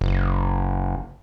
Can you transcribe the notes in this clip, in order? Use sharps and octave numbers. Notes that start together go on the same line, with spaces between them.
F#1